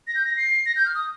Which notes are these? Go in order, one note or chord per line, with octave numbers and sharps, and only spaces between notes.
A#6
G6
A#6
C7
A#6
G6
F6
D#6